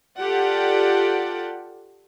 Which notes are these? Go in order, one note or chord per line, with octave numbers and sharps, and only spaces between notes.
F4 G4 A4 D5 F#5